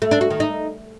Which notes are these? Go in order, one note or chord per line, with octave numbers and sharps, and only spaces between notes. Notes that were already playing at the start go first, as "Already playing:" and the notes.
A3
D4
F#4
D#3
D#4